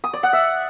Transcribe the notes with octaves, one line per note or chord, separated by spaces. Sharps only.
D#6
D5
F#5
E5